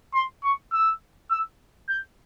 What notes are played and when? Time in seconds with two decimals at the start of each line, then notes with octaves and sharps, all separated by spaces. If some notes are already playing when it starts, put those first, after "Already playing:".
0.14 C6
0.44 C#6
0.73 E6
1.31 E6
1.89 G6